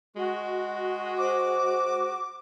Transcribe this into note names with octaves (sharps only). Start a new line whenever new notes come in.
G#3 F#4
C5 D6